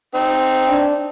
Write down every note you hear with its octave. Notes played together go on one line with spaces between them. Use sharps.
C4 D#4 G5
D4